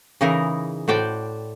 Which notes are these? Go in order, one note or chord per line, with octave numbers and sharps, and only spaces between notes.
C#3 E3 D#4 E4 G#4 A#4
A2 F#4 C5 D5 G5